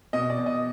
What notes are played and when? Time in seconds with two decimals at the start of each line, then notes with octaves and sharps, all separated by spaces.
0.13 B2 D#5
0.30 D5
0.38 B2
0.46 D#5